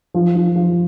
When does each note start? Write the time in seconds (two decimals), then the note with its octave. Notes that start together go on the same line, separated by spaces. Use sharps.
0.14 F3
0.35 F3
0.56 F3